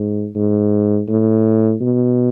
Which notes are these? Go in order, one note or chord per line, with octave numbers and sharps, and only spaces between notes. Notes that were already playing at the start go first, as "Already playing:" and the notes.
Already playing: G#2
G#2
A2
B2